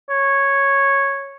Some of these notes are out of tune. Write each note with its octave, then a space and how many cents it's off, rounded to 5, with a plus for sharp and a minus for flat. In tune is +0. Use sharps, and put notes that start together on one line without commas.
C#5 -5